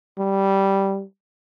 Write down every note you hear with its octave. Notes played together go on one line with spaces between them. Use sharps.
G3